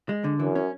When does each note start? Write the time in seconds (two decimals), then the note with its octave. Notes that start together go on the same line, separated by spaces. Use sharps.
0.09 G#3
0.24 D3
0.40 F#2 E3
0.56 C#4